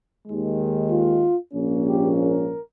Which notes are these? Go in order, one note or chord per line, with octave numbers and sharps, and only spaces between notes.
D#2 D#3 G#3
F4
A#1 G#2 F3 A#3 C#4
G4
A#4